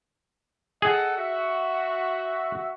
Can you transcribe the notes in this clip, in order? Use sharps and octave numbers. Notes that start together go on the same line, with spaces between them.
G#4 A4 D#5 F#5
F#4 E5